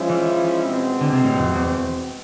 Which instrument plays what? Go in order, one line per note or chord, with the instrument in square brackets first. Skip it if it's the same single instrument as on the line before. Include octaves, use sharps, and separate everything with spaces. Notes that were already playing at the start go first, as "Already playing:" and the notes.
Already playing: [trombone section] F3 G#3 C#4 E4
[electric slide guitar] E3
[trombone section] B2 G#3 C4
[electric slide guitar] D3
C3
A2
F2
E2